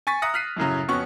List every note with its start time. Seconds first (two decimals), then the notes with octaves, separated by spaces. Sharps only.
0.07 G#5 C#6 A6 B6
0.22 E5 A#5 D#6 F#6 A#6 C#7
0.34 F6 F#6 B6 C7 D#7
0.57 F#2 A2 C#3 F#3
0.88 F2 B3 C#4 F#4 C#6 F#6